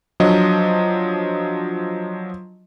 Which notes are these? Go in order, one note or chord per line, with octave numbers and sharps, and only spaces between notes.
F3 F#3 D4 D#5